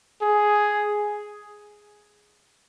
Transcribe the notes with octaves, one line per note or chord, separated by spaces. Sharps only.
G#4